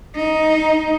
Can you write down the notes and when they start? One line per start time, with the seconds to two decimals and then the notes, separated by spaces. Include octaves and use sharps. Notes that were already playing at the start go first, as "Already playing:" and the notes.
0.15 D#4